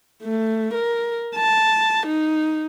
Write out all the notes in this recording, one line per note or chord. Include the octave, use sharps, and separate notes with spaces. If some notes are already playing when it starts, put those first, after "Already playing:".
A3
A#4
A5
D#4